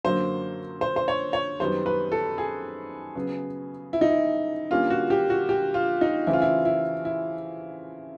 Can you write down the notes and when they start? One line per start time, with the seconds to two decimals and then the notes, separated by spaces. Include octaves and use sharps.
0.04 F#2 D3 F#3 A#3 C5
0.81 C5
0.96 C5
1.08 C#5
1.33 C#5
1.60 F#2 D#3 G3 B3 C5
1.86 B4
2.12 A4
2.38 G#4
3.15 C#3 F#3 B3
3.93 E4
4.01 D#4
4.10 E4
4.70 D3 G3 A#3 C#4 F4
4.90 F#4
5.10 G4
5.30 F#4
5.49 G4
5.74 F4
6.01 D#4
6.27 C#3 E3 A3 C4 E4
6.33 F4
6.42 E4
6.65 E4
7.05 E4